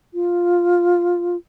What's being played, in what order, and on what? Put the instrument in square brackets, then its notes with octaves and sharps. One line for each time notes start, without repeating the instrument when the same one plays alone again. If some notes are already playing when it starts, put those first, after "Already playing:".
[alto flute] F4